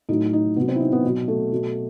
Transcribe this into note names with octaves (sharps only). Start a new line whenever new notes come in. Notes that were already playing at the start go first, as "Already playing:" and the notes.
A2 F#3 D#4
D#4
C3 F#3 B3
C4
E4
D#4
B3
B2 F#3
A3
B2 F#3